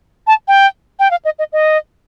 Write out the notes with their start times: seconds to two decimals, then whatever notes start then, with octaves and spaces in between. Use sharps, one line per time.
0.27 A5
0.48 G5
0.99 G5
1.11 F5
1.25 D#5
1.39 D#5
1.53 D#5